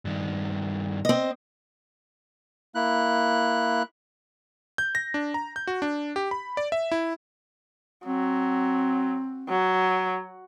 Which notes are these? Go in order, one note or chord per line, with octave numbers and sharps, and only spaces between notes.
G2 D#3
C4 D#5
A#3 E4 F#6
G6
A#6
D4
A#5
G6
F#4
D4
G4
B5
D5
E5
E4
F#3 C4
F#3